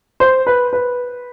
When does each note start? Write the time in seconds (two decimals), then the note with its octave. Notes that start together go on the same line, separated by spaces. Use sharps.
0.20 C5
0.47 B4
0.73 B4